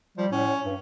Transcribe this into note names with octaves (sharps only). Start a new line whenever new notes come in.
F3 G3
A2 C#4
G2